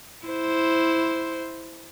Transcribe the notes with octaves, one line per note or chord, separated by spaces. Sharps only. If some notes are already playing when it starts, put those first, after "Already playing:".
E4 C5